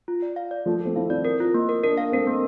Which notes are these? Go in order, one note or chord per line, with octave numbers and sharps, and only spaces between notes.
F4
D5
F5
D5
F3 A3 A4
A3 C4 A4
C4 E4 F5
C4 E4 D5
A#4
F4
A#3
A#4
A#3 D4 A#4
F5
A3 C4 A#4
A#3